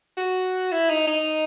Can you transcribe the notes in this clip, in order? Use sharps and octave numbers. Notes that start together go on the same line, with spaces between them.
F#4
E4
D#4
D#4